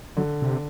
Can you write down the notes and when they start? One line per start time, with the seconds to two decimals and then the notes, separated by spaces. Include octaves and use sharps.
0.17 D3 F#3
0.42 C3